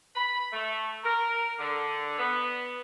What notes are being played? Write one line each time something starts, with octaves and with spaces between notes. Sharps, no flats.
B5
A3
A#4
D3
B3